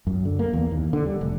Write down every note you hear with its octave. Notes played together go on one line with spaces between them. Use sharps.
F#2
D3
A#3
E2
D#2
D3
G3
F1